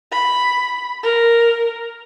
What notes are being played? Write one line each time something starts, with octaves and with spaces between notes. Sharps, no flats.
B5
A#4